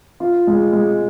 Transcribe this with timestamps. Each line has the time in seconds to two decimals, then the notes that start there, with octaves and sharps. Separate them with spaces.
0.20 F4
0.47 G#3
0.73 G#3